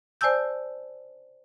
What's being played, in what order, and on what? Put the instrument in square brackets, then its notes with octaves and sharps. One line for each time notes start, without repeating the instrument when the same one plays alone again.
[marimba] C5 D5 G#5 A5 E6 G6